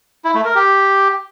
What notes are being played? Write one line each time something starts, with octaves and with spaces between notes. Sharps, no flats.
E4
A3
A#4
G4